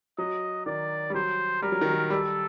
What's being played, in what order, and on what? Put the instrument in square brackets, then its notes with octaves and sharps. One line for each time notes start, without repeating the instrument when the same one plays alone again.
[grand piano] F#3 [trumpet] D#5
[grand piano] D#3 [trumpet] D5
[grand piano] G3
[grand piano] F#3 [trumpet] C5
[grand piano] G3 [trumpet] A#4
[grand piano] F#3
D#3
F#3
[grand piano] G3 [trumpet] A4